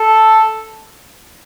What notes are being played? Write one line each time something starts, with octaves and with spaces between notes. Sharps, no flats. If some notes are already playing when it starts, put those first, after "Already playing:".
Already playing: A4